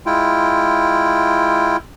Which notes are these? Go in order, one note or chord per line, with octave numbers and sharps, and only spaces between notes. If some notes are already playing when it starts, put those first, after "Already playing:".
G#3 E4 F4 G5